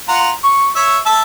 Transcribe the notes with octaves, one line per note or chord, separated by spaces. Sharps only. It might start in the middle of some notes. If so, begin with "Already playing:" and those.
F4 F#5 A#5
C#6
C#5 E5
E5 A5